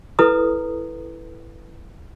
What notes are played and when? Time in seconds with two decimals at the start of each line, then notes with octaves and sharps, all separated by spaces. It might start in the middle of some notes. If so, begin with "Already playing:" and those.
0.19 E4 A4 B4 A#5 D#6